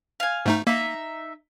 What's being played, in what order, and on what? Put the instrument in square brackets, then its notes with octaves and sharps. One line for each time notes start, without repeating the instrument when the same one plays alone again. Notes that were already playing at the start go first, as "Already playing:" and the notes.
[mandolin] F5 G#5
[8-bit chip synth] G#2 A3 D#4
[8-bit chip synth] A#3 [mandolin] D#4 E5